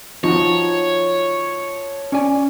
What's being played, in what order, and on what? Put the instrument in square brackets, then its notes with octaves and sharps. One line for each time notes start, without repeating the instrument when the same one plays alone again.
[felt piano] F3 [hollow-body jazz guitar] D#4 F#4 [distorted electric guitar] C#5
[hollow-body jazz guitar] C#4 D5 G#5